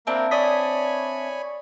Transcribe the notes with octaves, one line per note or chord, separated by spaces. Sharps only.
A#3 C4 D4 E4
C#5 D5 G#5 B5 D#6 B6